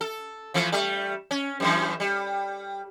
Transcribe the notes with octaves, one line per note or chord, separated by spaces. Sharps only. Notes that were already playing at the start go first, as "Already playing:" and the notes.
A4
E3 F3 A3
G3 A3
C#4
F#2 A2 E3
G3